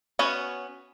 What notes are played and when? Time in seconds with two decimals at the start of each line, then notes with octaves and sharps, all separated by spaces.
0.19 B3 C#4 F#4 C#5